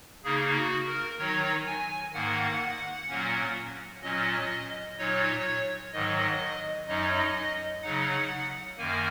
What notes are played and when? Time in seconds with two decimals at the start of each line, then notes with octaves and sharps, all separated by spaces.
0.24 C#3 A#3 D#4 G#4
0.55 F#4
0.86 A#4
1.18 D#3 F#3 D#4 C#5
1.66 G#5
2.13 G#2 D#3 A#3 F#5
3.08 A#2 F#3 A#3 C#4
4.03 A#2 F#3 C#4 D#5
4.98 A#2 F#3 D#4 C#5
5.93 G#2 D#3 F#3 D#5
6.88 F#2 F#3 D#4 D#5
7.82 C#3 F#3 D#4 F#5
8.78 F#2 D#3 A#3 G#5